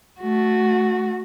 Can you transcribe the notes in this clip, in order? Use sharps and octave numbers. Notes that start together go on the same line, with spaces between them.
A3 F#4